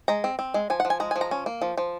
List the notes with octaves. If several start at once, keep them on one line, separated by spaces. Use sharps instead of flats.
G#3 A#5
C4
C4
G#3
F3 G#5
F#5
F3
G#5
G#3 A#5
G#5
F3
A#5
C#4
A#3
F3
F3